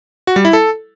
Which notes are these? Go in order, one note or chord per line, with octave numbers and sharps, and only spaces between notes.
F#4
G3
E4
A4